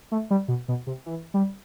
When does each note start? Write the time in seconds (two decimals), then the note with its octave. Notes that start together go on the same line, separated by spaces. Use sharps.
0.12 A3
0.31 G3
0.48 B2
0.68 B2
0.87 C3
1.06 E3
1.34 G3